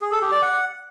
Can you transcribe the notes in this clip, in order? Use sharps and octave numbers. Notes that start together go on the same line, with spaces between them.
G#4
A4
G4
D5
F#5